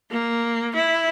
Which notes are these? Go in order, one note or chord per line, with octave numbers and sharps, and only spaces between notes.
A#3
E4